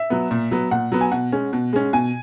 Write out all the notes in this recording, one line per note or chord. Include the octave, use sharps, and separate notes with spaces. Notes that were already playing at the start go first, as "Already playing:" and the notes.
Already playing: E5
F#3 B3
A#2
F#3 B3
A#2 F#5
F#3 B3
G#5
B2 F#5
G#3 C#4
B2
G#3 C#4
B2 G#5